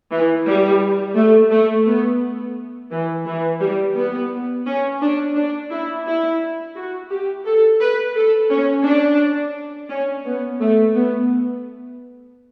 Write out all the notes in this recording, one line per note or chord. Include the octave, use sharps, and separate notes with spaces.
E3
G3
A3
A3
B3
E3
E3
G3
B3
C#4
D4
D4
E4
E4
F#4
G4
A4
B4
A4
C#4
D4
C#4
B3
A3
B3